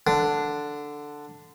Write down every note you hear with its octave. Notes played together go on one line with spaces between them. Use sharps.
D3